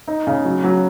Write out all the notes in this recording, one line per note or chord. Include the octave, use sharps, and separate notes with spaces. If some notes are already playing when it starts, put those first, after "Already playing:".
D#4
C#3
F#3
F#3